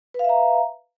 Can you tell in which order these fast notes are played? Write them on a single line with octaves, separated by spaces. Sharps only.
B4 F5 E5 A#5